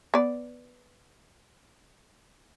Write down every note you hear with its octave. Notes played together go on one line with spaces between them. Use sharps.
B3 D5